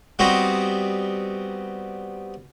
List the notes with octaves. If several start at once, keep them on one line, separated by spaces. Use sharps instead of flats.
G3 B3 C4 D#4 F#4